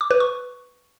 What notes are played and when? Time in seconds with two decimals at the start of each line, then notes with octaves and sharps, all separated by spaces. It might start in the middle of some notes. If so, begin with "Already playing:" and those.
0.01 D6
0.11 B4
0.20 C#6